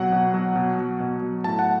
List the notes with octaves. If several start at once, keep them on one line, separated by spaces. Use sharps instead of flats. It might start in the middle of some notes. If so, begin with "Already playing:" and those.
Already playing: B2 F#3 F#5
B2
F#3
B2
F#3
B2
F#3
A2 A5
F#5